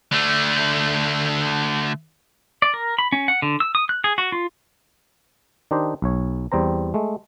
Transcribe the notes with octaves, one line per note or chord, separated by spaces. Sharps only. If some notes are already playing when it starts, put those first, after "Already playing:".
D3 A3
D5
A#4
B5
C#4
F#5
D3
E6
D#6
F#6
G#4
F#4
F4
D#3 D4 D#4 G4 C5 D#5
B1 C#5
E2 G3 C4 C5 A#5
G#3 A3